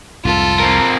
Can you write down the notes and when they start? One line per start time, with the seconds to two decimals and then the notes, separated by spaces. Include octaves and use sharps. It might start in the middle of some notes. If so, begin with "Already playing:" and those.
0.25 C2 F2 G#2 F4 A4
0.60 C4 A#4